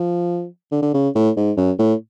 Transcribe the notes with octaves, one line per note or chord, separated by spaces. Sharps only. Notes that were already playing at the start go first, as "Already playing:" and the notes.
Already playing: F3
D3
D3
C#3
A2
G#2
F#2
A2